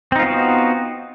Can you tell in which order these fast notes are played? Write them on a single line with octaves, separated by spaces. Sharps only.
C4 D#4 F4 B3 F#4